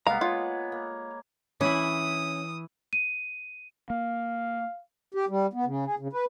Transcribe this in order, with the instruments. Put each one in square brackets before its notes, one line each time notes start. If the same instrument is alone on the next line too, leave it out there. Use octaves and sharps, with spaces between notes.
[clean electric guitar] C2 G#3 A#5 [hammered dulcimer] A#3 B3 [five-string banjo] F5
[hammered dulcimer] G#3 [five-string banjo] F4 [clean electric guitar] C#5
[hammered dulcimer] A#3
[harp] E3 E4 [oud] C#4 [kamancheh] D#6
[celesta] D#7
[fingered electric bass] A#3 [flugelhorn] F5
[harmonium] G4
G3
B3
C#3
G#4
C#3
B4